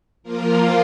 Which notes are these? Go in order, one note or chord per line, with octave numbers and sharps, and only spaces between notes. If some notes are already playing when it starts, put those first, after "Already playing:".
F3 A#3 F4 A#4